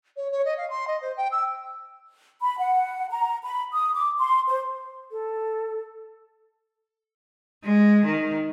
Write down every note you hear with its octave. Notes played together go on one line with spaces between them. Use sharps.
C#5
C#5
D#5
F5
C6
D#5
C5
G5
E6
B5
F#5
A#5
B5
D#6
D6
C6
C5
A4
G#3
D#3